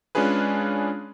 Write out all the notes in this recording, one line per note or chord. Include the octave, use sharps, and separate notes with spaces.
G#3 C#4 D4 F4 G#4 B4